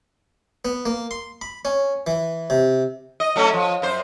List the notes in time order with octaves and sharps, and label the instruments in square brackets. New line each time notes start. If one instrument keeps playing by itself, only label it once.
[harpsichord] B3
A#3
C6
B5
C#4
E3
C3
[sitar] D#5
F#3 A3 C#4
F3
F#2 C5